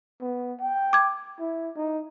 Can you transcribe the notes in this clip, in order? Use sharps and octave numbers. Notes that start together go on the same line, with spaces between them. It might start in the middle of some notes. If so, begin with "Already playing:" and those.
B3
G5
D6 G#6
E4
D#4